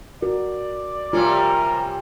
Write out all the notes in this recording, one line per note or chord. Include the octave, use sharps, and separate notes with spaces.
F#4 A#4 D5
C3 G3 C#4 F4 A#4